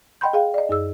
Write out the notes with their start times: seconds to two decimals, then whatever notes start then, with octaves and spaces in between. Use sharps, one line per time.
0.21 D#5 F#5 G5 B5 C6 G6
0.33 G#4 F5 G5
0.54 D5 D#5
0.69 F#2 G#4 E6